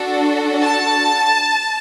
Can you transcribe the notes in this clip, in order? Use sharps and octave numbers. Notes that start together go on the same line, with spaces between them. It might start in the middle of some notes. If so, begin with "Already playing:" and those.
Already playing: D4 F#4 A4
A5